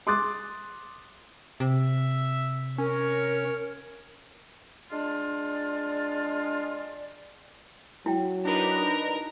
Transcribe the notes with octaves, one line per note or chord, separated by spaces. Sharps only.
C6 D6 D#6 F#6 A6
C3 E5
C#4 A#4 C#5
G#3 D4 F4 D5
F#3 E4 G5
D4 D#4 A#4 B4